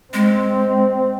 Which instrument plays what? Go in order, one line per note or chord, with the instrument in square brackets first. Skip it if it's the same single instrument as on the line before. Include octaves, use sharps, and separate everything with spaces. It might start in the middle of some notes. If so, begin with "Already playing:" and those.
[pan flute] G#3 [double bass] C4